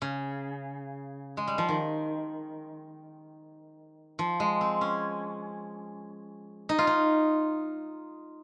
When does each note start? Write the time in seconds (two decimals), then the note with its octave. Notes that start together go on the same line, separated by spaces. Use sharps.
0.02 C#3
1.37 G#3
1.48 G3
1.58 F3
1.69 D#3
4.19 F3
4.40 G#3
4.61 C4
4.81 C#4
6.69 D#4
6.79 F4
6.87 D#4